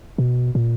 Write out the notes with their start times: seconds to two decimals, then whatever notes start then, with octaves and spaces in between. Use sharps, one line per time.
0.18 B2
0.55 A#2